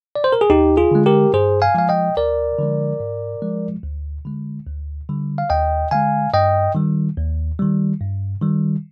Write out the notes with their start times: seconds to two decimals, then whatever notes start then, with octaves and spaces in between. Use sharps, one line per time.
0.16 D5
0.24 C5
0.32 A#4
0.41 G#4
0.50 D#2 D#4 G4
0.77 F4 G#4
0.91 D3 G#3
1.06 G4 A#4
1.34 G2 G#4 C5
1.62 F5 G#5
1.75 F3 G#3 F5
1.89 D#5 G5
2.17 D2 A#4 D5
2.58 D3 F3 G#3
3.00 G#2
3.42 F3 G#3
3.84 D2
4.25 D3 G#3
4.66 D2
5.09 D3 G3
5.38 F5
5.50 D#2 D#5 G5
5.91 D3 G#3 F5 G#5
6.34 G2 D#5 G5
6.75 D#3 G3
7.17 D#2
7.59 D#3 G3
8.01 G2
8.41 D#3 G3